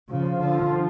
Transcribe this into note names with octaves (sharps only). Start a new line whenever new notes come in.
C#3 F3 F4
D3